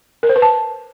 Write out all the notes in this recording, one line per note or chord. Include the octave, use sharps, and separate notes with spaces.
A#4
C5
B4
A5